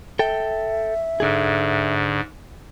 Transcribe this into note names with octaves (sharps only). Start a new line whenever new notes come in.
A4 E5 G5
G#2 D3 G#4